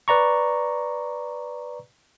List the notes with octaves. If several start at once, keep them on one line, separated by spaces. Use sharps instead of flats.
B4 D5 A#5 C#6